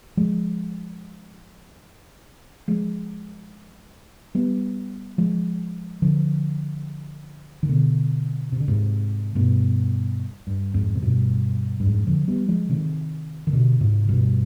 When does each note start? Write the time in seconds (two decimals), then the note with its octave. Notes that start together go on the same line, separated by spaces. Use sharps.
0.17 F3 G#3
2.68 F3 G#3
4.35 G3 B3
5.18 F3 G#3
6.02 D3 F3
7.63 D#3
7.69 B2 D3
8.52 C3
8.60 D3
8.68 G#2 C3
9.35 G2 B2
10.47 G2
10.74 F2 G#2
10.95 C3
11.02 G2 B2
11.80 G2
11.86 F2 G#2
12.07 D3 F3
12.28 G3 B3
12.48 F3 G#3
12.69 C3 D#3
13.47 D#3
13.53 B2 D3
13.81 G#2 C3
14.09 G2 B2